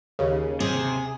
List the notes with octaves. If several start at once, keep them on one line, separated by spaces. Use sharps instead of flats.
D#2 C#3
C3 G#4